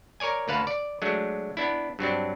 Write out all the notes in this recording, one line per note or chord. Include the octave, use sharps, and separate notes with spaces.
A#4 C#5 D5 G#5
D2 A#3 B4 F5 F#5 A5
D5
F#3 G#3 A3 D4
B3 D4 E4
G2 F#3 C4 D4